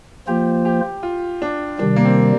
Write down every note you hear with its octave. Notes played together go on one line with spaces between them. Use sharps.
F3 A#3 F4 G4 C5
G4
F4
D4
C3 D#3 G3 D4
A#3
C4